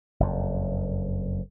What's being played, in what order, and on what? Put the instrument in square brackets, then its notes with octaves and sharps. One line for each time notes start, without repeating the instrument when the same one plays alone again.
[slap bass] F#1 F2